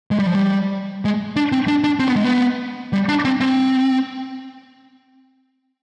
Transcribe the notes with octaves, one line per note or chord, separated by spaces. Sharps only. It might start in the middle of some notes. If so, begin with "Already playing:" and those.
G#3
G3
F3
G3
G#3
D4
C4
D4
D4
C4
B3
G#3
B3
G3
D4
C4
C4